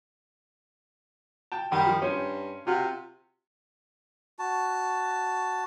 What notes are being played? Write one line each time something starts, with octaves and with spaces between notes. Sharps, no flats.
G5 A5
F#2 D#3 G3
D#3 F3
G2 C#4 C5
C3 F4 F#4 F5
F#4 A5